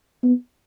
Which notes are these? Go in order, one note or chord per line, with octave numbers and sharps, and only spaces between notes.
B3